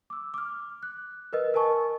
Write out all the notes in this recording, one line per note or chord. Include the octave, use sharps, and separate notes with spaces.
D6 E6
D6 F6
F#6
A#4 B4 D#5
A#4 D#5 G#5 A5 C#6